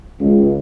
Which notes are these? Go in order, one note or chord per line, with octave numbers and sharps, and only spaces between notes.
C#2